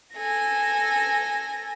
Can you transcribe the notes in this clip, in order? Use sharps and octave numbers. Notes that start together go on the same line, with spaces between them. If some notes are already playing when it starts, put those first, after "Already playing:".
A4 G#5 A#6